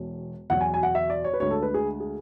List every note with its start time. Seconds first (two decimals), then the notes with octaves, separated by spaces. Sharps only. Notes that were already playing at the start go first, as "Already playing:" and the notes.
Already playing: E1 E2 B2
0.50 E2 B2 F#3 F#5
0.61 G#5
0.74 G#5
0.83 F#5
0.95 E5
1.10 D5
1.24 C#5
1.34 B4
1.40 D2 D3 G#3 C#5
1.51 A4
1.62 B4
1.74 G#4
2.00 G#4